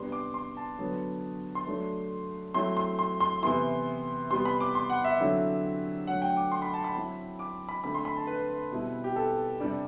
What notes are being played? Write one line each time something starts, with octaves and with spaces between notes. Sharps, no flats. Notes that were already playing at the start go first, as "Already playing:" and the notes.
Already playing: C3 G3 B3 D4 C6
D6
C6
A5
D3 F#3 B3
C6
F#3 A3 D4
F#3 A3 C4 E4 C6
C6
C6
C6
C3 E3 B3 E4 C6
C3 G3 B3 C6
B5
D6
C6
F#5
E5
D3 F#3 C4 E4
D3 F#3 A3 F#5
G5
D6
C6
B5
A5
B5
F#3 C4 E4
D6
B5
D3 A3 C4 B5
C6
B5
A5
B4
B2 G3 C4 E4
G4
A4
C3 G3 D4